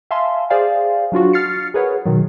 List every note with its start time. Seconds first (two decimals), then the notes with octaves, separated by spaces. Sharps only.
0.11 E5 F5 G#5 A5 C6
0.50 G#4 C5 D5 F5 G#5
1.12 F#3 D4 F4 F#4
1.33 F6 A6 C7 C#7
1.74 G#4 A#4 B4 C#5 F#5
2.06 B2 D#3 F#3